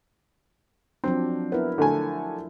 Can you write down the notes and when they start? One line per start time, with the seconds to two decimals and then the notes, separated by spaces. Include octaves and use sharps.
1.04 F3 F#3 C4 D4
1.52 B3 E4 A#4
1.78 D3 A3 G#5